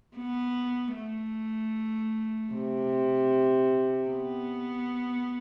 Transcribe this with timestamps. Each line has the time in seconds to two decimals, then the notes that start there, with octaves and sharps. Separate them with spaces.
0.16 B3
0.95 A3
2.52 C3
4.09 B3